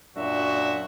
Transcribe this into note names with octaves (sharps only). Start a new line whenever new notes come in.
F#2 A#2 D4 F#4 E5